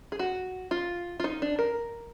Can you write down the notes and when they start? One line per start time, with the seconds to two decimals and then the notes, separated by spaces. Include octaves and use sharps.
0.12 G#4
0.19 F#4
0.71 F4
1.20 F4
1.24 D#4
1.42 D4
1.59 A#4